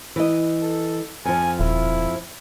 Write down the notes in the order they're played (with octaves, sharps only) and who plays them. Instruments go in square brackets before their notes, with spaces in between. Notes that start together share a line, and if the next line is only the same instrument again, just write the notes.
[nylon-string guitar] E3 D#5
[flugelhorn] A4
[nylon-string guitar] F2 F3 [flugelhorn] G#5
[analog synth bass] D#1 [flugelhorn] E4